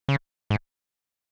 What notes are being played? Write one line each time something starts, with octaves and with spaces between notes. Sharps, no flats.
C#3
G#2